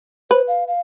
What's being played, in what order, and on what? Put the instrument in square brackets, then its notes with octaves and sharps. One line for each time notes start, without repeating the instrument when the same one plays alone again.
[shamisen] B4 [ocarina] C5
[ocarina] F5
F5